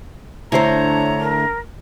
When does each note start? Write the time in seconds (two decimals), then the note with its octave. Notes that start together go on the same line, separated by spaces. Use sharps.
0.52 D3 A3 D4 E4 C5 C#5 A#5
1.20 A#4